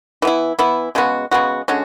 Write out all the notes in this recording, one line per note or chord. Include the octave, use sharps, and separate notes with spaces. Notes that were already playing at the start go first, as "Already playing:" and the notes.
E3 B3 E4
E3 B3 E4
C#3 G#3 B3 F#4
C#3 G#3 B3 F#4
D3 G#3 C#4 F#4